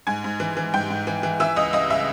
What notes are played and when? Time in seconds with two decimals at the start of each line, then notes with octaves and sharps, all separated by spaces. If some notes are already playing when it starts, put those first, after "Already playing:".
0.07 G#2 G#5 G#6
0.24 G#2
0.40 E3
0.57 E3
0.74 G#2 G5 G6
0.90 G#2
1.07 E3
1.23 E3
1.40 E3 E5 E6
1.56 C#2 D#5 D#6
1.73 C#2 D#5 D#6
1.90 C#3 E5 E6